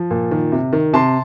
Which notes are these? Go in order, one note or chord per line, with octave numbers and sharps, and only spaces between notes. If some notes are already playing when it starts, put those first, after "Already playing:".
Already playing: F3
A#2
D#3
C3
D#3
C3 A5 C6